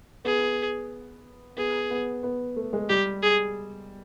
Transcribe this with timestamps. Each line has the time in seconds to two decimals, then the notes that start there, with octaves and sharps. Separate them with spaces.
0.25 B3 G#4
1.57 B3 G#4
1.90 B3
2.23 B3
2.56 A3
2.73 G#3
2.89 G3 G4
3.23 G#4